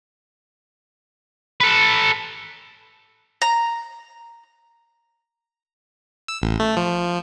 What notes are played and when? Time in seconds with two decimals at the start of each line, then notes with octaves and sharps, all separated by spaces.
1.60 A4 B4
3.42 A#5
6.28 E6
6.42 A1
6.60 A3
6.77 F3